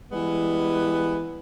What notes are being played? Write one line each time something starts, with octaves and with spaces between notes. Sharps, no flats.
E3 G3 G#3 B3